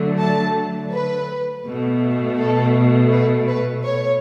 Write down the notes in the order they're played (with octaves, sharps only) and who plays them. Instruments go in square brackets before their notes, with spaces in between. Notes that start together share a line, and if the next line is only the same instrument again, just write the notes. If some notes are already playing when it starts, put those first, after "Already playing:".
Already playing: [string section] D3 F#3 A3
A5
B4
B2 A3
A4
B4
B4
C#5